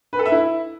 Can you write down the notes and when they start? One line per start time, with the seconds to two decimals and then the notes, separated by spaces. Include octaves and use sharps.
0.13 B4
0.19 A4
0.26 E5
0.32 E4